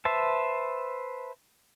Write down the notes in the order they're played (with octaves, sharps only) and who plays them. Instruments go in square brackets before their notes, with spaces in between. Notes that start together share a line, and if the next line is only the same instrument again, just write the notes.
[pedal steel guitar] B4 C5 E5 A5